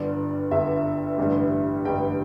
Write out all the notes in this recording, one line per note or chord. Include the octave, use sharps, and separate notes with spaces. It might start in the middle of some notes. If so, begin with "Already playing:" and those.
Already playing: G1 G2 D3 D5
G1 G2 D3 E5
A1 G2 D3 G3
A1 G2 D3 G3 G5